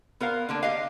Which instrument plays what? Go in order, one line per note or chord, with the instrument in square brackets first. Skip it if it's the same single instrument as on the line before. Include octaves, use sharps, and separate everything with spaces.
[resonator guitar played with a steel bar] B3 A#4 C5 F5
D3 A#3 D4
G4 D#5 F5